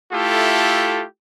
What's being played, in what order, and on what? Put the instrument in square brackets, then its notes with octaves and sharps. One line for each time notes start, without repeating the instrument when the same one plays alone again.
[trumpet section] A3 E4 F4 G4 A4